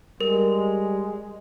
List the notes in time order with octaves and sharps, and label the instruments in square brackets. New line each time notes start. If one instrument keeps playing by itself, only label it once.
[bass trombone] G3 [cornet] G#3 [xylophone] A#4